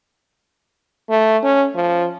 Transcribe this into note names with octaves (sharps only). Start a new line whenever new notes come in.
A3
C#4
F3